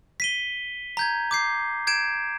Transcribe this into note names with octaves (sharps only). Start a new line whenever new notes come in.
B6 D#7 G7
A#5 G6 G#6
D6 G6 C7
G6 G#6 D7 E7